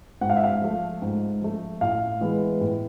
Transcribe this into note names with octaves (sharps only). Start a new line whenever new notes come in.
G#2 F#5
F5
E5
F5
F3 A3
G#2
F3 A3
A2 F5
E3 G#3 B3
A2